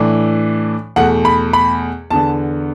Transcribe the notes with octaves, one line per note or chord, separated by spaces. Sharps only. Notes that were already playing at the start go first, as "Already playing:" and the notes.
Already playing: A2 E3 A3 D4
E2 B2 A3 F#5
B5
B5
E2 D3 B3 A5